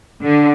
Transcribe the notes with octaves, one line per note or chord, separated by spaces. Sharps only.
D3